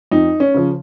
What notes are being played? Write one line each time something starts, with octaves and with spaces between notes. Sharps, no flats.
F2 D#4
C#4
C#3 F3